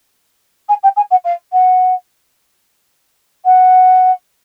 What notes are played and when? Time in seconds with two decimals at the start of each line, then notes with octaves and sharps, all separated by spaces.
0.69 G#5
0.83 G5
0.96 G#5
1.11 F#5
1.24 F5
1.52 F#5
3.45 F#5